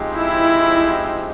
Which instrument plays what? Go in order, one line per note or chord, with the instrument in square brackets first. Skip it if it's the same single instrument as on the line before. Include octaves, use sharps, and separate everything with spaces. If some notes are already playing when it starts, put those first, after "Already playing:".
Already playing: [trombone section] F3 G#3 C4 D#4 G4
[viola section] E4